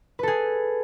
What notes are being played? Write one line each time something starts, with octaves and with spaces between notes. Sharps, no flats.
G#4 A4 B4